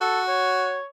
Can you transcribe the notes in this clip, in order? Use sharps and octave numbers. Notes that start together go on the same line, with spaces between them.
F#4 A4
C#5